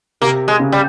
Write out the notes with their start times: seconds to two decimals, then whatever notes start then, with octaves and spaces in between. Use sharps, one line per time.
0.22 C3 A#3
0.48 G#3
0.60 C#3
0.72 G3